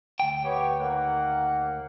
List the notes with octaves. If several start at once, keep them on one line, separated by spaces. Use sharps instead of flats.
D2 G5
B3 G4 C#5
D#2 A#3 F#5